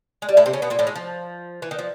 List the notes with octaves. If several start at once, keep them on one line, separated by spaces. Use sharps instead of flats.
G#3
G3
A2 A3
C3 C4
C#3 C#4
B2 B3
A#2 A#3
A2 A3
G#3
F3
E3
D#3
F3